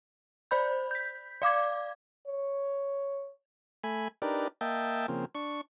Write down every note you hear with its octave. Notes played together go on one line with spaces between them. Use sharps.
C5 D5 B5 G6
G6 B6
D5 F5 D6 G#6
C#5
A3 G#5 B5
D4 D#4 G4 A#4 B4 D5
A#3 D#5 E5 G5 A5
C#3 F3 A#3 C4
D4 C#6